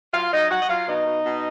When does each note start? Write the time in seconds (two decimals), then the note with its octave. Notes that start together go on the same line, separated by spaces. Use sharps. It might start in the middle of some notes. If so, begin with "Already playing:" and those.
0.13 F#3 F4 F5
0.32 F#3 D#4 D#5
0.51 F#3 F#4 F#5
0.61 D#5
0.69 F#3 F4 F5
0.87 B2 D#4 D#5
1.06 B2
1.24 B2